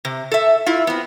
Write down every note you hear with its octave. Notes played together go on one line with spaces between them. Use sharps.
C3
A4 E5
E4 F4
B3 C4